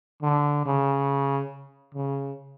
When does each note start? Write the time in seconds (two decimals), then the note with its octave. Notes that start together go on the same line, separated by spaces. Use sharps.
0.22 D3
0.66 C#3
1.95 C#3